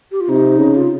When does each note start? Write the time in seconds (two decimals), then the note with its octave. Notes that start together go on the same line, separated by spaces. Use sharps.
0.11 G4
0.21 F4
0.29 C3 D#4
0.58 C#3
0.76 F4